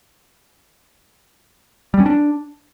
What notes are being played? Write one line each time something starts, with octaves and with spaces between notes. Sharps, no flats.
G3
C#4
D4